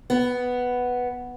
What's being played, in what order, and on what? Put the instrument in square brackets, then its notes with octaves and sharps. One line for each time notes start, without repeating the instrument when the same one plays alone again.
[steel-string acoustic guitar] B3